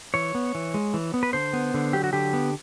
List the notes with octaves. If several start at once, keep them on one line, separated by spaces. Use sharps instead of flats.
E3 C#5
B3
E3
G#3
E3
B3
B4
D3 C5
B3
D3
F#3 G4
F#4
D3 G4
B3